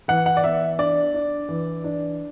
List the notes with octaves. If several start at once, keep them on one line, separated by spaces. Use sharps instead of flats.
E3 F#5
F#5
D5
B3 E5
D4 D5
D4
E3
D4